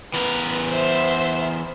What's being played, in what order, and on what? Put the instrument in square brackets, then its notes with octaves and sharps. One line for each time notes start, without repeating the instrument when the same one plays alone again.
[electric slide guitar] E3 B3 A#4 [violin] B4
[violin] C5 E5